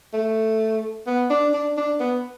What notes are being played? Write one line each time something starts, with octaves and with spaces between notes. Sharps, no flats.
A3
B3
D4
D4
D4
B3